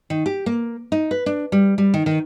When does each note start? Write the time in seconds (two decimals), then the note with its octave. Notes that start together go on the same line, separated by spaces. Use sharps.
0.10 D#3
0.26 G4
0.46 A#3
0.92 D#4
1.11 B4
1.26 D4
1.52 G3
1.78 G3
1.94 D#3
2.06 D#3